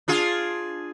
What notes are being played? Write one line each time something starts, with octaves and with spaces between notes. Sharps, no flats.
D4 F4 G#4